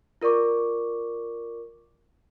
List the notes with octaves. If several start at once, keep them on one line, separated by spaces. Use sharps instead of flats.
F4 A#4 D5 C#6 D6